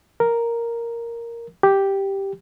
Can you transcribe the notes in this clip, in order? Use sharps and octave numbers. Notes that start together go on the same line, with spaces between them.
A#4
G4